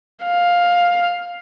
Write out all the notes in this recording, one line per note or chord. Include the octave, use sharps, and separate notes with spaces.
F5